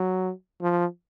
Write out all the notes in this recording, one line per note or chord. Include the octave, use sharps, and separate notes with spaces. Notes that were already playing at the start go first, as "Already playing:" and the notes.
Already playing: F#3
F3